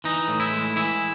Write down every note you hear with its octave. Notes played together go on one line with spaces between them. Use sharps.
E3 D#4
A2
E4
G#3
E3 E4